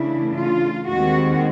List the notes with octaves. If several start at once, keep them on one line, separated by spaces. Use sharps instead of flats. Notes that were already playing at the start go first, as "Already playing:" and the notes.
Already playing: C#3 E3 A3 D4 E4
F4
D#2 D#3 G#3 C4 F#4